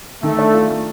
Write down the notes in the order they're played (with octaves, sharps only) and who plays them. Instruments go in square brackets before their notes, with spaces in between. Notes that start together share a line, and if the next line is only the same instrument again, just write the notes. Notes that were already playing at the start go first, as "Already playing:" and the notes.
[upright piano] D#3 [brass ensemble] A3
[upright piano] D4
F4
A3